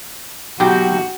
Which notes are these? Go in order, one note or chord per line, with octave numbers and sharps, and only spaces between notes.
B1 F#4 G4 G5